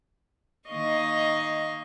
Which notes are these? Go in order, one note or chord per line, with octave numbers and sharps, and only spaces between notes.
D#3 A#3 D#5 F5 C#6